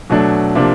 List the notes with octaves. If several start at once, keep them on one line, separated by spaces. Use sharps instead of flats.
B2 F#3 A3 D4
C3 F3 A#3 D4